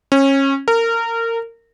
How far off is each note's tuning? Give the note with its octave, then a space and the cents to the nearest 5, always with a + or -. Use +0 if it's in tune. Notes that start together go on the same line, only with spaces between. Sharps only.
C#4 -25
A#4 -25